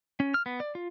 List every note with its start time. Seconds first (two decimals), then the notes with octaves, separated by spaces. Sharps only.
0.20 C#4
0.34 F6
0.46 B3
0.60 D5
0.75 F4